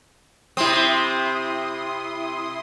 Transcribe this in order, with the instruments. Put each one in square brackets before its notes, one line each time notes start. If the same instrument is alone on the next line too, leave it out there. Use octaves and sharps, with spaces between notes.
[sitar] C3 C4 [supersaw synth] E4 C6 D#6